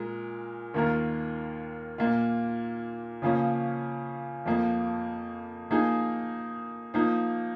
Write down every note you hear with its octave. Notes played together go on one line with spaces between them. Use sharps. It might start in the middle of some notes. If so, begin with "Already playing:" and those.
Already playing: A#2 G#3 A#4
D#2 D#3 A#3 F4 A#4
A#2 A#3 F4
C#3 F3 A#3 C#4
F2 F3 A#3
F3 A#3 D#4 G#4
F3 A#3 D#4